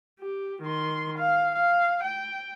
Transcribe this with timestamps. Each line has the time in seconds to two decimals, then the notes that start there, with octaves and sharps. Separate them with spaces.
0.20 G4
0.62 D#3 C6
1.19 F5
1.56 F5
2.03 G5